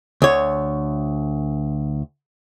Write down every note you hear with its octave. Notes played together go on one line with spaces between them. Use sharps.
D2 C#5